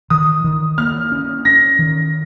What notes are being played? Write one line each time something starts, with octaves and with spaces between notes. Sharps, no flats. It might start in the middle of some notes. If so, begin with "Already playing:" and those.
D#3 D#6
D#3
A#3 F6
C#4
C#4 A#6
D#3